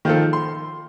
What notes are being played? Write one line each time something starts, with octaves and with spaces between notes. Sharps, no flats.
D#3 F3 A4
C6